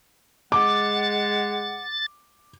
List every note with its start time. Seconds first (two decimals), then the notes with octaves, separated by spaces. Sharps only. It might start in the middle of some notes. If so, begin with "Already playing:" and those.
0.52 G#3 F#5 D6 A6